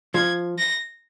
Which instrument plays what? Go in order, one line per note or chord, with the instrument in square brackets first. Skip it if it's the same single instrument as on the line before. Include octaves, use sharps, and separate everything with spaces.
[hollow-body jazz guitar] F3 [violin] G#6
[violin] A#6